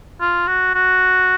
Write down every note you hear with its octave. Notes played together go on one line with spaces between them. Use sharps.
F4
F#4
F#4